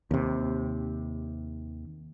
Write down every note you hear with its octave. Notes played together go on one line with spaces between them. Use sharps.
D#2 C3